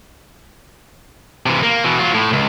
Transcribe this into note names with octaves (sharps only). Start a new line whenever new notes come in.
C3 E3
A#3
B2 E3
F#3 F4
A2
C#2